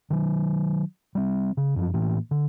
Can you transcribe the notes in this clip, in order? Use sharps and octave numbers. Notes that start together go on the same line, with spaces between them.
D#3 F#3
G3 C4
C#3
F#2 F3
A2 E3 A#3
D3